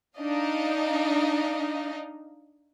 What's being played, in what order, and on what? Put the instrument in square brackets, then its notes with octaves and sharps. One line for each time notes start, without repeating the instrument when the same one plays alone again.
[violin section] D4 D#4 D#5 F5